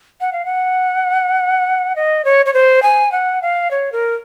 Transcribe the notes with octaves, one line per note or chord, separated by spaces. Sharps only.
F#5
F5
F#5
D#5
C#5
C#5
C5
G#5
F#5
F5
C#5
A#4